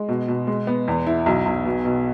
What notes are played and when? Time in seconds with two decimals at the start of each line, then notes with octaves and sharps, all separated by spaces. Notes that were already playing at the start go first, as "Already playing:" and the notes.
Already playing: G#3
0.09 B2
0.28 B2
0.47 G#3
0.67 B3
0.88 E2
1.07 E4
1.26 B1
1.46 B1
1.66 B2
1.85 B2